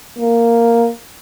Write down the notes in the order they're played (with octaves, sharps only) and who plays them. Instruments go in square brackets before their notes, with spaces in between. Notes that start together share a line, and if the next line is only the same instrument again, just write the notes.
[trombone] A#3